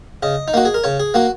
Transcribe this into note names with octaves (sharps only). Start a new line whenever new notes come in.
C#3 D#5
D#4
A#3 F#4
G#4
A#4
C#3 C#5
G#4
A#3 F#4